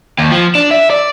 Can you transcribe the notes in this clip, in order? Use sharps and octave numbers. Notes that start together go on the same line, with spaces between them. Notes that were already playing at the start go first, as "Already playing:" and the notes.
D#2
F3
D4
E5
D5